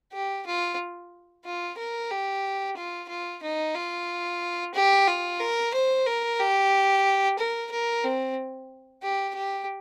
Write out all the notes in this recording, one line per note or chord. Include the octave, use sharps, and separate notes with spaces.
G4
F4
F4
A#4
G4
F4
F4
D#4
F4
G4
F4
A#4
C5
A#4
G4
A#4
A#4
C4
G4
G4